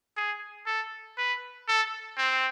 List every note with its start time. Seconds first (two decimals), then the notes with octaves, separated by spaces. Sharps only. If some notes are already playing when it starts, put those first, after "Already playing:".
0.17 G#4
0.67 A4
1.18 B4
1.68 A4
2.18 C4